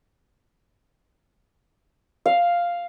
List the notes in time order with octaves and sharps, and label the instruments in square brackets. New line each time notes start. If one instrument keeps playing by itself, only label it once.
[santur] F5